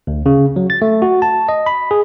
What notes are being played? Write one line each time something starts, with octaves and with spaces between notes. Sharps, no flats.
D2
C#3
F#3
A6
A3
F#4
A5
D#5
B5
G#4